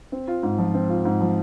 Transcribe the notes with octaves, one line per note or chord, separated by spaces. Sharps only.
C4
F4
G#2
F3
C4
F4
G#2
F3